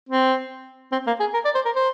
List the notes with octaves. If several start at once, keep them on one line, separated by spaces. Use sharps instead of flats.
C4
C4
A#3
G#4
A#4
D5
C5
A#4
C5